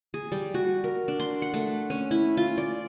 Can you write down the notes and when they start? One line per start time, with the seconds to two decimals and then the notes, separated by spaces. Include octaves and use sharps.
0.14 G#4
0.32 G3
0.54 F#4
0.84 A#4
1.08 D4
1.20 C6
1.42 F#5
1.54 A3
1.90 C#4
2.11 E4
2.37 F4
2.58 D5